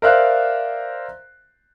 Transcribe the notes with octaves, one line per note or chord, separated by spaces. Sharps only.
A#4 C5 D5 E5 F5 F#6